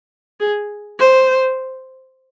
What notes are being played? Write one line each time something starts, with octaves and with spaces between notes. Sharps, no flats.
G#4
C5